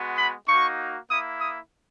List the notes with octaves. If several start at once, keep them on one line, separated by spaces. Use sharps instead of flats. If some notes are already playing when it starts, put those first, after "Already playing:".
Already playing: G#3 B3 F#4
B5
A#3 D#4 F#4 C#6
A#3 E4 D#6
D#6